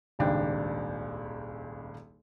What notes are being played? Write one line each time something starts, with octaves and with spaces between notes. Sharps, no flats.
D#1 G#1 C#2 D4 G5